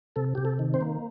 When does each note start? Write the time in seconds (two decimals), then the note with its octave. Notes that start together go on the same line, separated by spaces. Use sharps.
0.16 C3 A4
0.35 C3 G4
0.45 A4
0.59 D#3
0.74 C4 C5
0.81 A#3